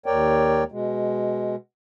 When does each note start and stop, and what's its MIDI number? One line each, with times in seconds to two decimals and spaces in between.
0.06 0.64 39
0.06 0.64 70
0.06 0.64 73
0.06 0.64 74
0.06 0.64 79
0.72 1.56 47
0.72 1.56 56